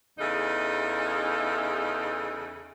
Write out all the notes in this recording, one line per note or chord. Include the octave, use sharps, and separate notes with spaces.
E2 C#3 D#4 A4 E5 F5